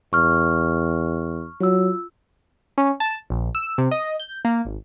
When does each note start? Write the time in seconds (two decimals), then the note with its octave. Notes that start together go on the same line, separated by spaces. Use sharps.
0.13 E2 C#6 F6
1.60 F#3 F4 E6
2.78 C#4
3.00 A5
3.30 A#1
3.55 E6
3.78 C3
3.91 D#5
4.20 G6
4.45 A#3
4.65 G#1